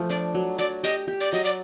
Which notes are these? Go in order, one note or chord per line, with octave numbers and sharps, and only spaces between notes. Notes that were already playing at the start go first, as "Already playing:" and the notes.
Already playing: F3 A3
D4 D5
F#3
F#3 D5
G4 D#5
G4
D5
F#3 D#5
D5